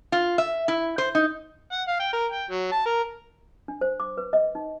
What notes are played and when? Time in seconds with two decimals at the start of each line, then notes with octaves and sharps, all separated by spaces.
0.12 F4
0.38 E5
0.68 E4
0.98 C5
1.15 D#4
1.72 F#5
1.88 F5
2.00 G5
2.13 A#4
2.32 G5
2.50 F#3
2.72 A5
2.86 A#4
3.68 D4
3.81 C5
4.00 D6
4.17 B4
4.33 D#5
4.55 D#4